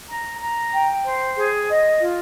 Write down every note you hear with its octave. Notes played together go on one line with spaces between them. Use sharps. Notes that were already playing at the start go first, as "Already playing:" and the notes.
A#5
A#5
G5
C5
G#4
D#5
F4